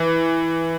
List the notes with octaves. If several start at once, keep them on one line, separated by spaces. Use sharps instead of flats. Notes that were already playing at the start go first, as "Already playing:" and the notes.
Already playing: E3